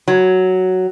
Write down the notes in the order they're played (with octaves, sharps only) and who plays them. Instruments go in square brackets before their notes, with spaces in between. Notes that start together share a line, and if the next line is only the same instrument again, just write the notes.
[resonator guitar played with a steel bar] F#3